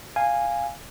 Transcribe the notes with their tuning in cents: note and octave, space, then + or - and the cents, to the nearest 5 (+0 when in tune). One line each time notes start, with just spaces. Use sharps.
F5 +0 G#5 -10